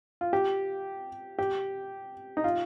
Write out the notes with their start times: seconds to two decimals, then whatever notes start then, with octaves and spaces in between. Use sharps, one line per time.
0.21 F4
0.33 G4
1.39 G4
2.37 D#4
2.44 F4